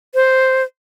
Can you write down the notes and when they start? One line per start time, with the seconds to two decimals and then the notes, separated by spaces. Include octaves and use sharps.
0.15 C5